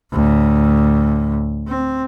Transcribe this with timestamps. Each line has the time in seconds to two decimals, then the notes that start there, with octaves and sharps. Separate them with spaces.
0.11 D2 A2
1.68 C4